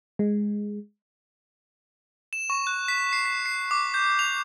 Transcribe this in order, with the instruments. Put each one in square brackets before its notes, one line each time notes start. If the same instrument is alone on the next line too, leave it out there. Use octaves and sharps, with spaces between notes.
[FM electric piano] G#3
[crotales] E7
C#6
F#6
B6
C7
B6
C7
D6
G6
F7